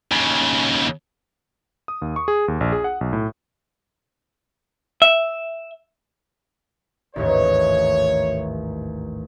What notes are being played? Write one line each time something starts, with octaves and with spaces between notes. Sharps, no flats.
D#2 C#3
D#6
D#2
C#6
G#4
D#2
A#1
G#4
F#5
B1
A2
E5
A1 D#2 G#2 C#5